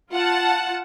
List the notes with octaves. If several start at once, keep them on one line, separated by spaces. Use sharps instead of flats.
F4 F#5 A5